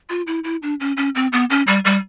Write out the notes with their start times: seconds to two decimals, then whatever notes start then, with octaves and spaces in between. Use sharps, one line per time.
0.10 F4
0.27 E4
0.44 E4
0.62 D4
0.80 C#4
0.97 C#4
1.15 C4
1.33 B3
1.50 C#4
1.67 G3
1.85 G3